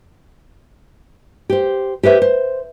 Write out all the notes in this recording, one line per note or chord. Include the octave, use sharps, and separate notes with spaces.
G4 C5
G4 B4 C5 E5
C5